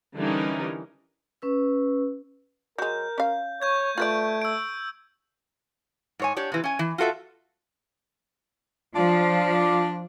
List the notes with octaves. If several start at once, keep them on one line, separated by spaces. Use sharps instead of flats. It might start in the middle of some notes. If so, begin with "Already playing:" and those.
D3 E3 G3 C#4 D#4 A#4
C#4 B4 E6
F#3 G#3 A#4 G6
C#4 F5
C#5 C#6 G6 G#6
A3 F4 B4 D5 G6 G#6 D7
E6 D7
G#2 C#5 G#5
D4 G4 C#5
C3 E3
C#4 G#5
E3
F4 F#4 A4 E5
F3 D4 F4